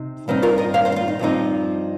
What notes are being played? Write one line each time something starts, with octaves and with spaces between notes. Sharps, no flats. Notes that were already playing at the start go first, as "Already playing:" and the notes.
Already playing: C3 D#4
G2 D#3 C4 D#4
F4 A#4
A#4 D#5
C5 F5
C5 F5
D#4
F4
D#4
G2 F3 C4 D#4